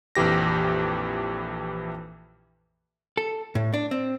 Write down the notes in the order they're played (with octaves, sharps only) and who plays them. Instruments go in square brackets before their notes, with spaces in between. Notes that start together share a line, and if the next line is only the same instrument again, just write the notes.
[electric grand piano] A#1 F2 E3 G4 A#6
[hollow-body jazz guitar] A4
A2
D4
C4